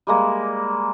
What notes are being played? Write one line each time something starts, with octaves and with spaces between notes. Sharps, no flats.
G3 G#3 A#3